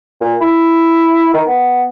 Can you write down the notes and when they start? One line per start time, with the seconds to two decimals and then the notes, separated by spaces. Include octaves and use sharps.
0.21 A#2
0.41 E4
1.34 D#3
1.47 B3